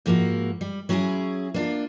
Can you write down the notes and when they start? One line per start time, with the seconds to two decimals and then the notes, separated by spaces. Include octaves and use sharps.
0.06 G#2 F3 A#3 E4 F#4
0.61 G3
0.89 F#3 C#4 E4 F#4 G#4
1.54 A#3 D4 F4